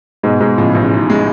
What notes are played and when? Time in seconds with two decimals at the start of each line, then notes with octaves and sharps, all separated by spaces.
0.23 G#2 B2 G#3
0.40 G#2 B2 G#3
0.58 A2 C#3 F3
0.75 A1
0.92 G#2
1.10 G#3